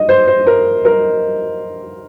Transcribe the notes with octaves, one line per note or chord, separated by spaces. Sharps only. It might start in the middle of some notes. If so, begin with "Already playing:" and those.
Already playing: D#5
C5
C5
A#4
A#4